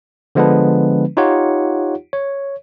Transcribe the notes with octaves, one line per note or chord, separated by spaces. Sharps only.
D3 F3 G#3 B3 D4 B4
D#4 F4 G4 C#5 F#5
C#5